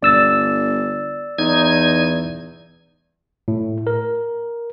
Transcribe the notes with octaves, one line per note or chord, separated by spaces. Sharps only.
G1 D5 E6 A6
E2 D#4 G#6
A2
A#4